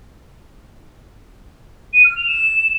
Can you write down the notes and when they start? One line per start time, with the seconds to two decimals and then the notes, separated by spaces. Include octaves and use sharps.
1.93 D#7
2.04 F6
2.15 F7
2.27 E7